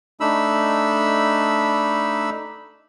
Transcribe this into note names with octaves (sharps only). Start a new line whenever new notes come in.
A3 D4 D#4 B5 E6